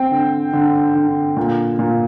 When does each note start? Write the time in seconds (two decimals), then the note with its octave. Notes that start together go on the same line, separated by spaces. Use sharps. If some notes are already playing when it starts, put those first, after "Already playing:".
Already playing: C4 G5
0.11 D3
0.53 D3
0.95 D3
1.37 A#2
1.79 A#2